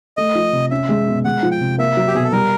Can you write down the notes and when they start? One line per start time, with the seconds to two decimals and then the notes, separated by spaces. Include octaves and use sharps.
0.17 A3 D#5
0.35 F3
0.53 C3
0.71 C#4 E5
0.89 G#3
1.07 B2
1.24 G#3 F#5
1.43 F3
1.51 G5
1.61 C3
1.78 A#3 E5
1.97 F#3
2.08 G4
2.15 B2 G#4
2.24 A4
2.32 G3 A#4